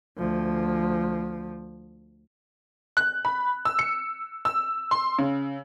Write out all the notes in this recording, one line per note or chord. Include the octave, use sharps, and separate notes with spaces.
D2 F3
F#6
B5
E6
C#7
E6
C6
C#3